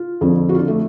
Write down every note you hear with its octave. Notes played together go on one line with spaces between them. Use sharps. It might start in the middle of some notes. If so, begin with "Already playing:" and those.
Already playing: F4
F2 D3 F3
F#4
F4
D4
A3